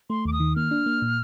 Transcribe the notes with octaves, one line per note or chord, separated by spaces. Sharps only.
A3 C6
D#2 D6
D#6
D#3
A#3 F6
D4
A#3
A#2